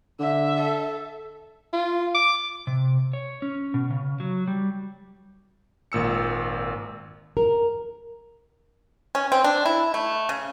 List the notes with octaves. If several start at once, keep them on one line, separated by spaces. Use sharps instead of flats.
D3 E5
A4
F4
D6
C3
C#5
C#4
B2
C#3
F#3
G3
G#1 A#2 E6 C#7
A#4
C#4
C4
D4
E4
A3
C#3